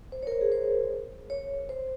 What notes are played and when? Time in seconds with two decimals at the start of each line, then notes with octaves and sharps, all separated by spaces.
0.12 C5
0.23 C#5
0.27 A#4
0.32 C5
0.41 G#4
0.52 C5
1.30 C#5
1.69 C5